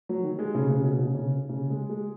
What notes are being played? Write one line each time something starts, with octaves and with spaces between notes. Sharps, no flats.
F#3
D#3
G#3
C#3
C#3
B2
C#3
C#3
C#3
G#3
G#3